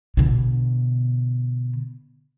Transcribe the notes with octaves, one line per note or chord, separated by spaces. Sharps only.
B2 D3